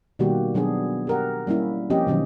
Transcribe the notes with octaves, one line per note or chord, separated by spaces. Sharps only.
B2 D#3 G3 A#3 F#4 G4
B2 F#3 B3 D4 G#4
G4 A#4 F#5
G3 A#3 C#4 E4
F3 A#3 C4 C#4 G4 D#5
B2 D#3 F#3 C#4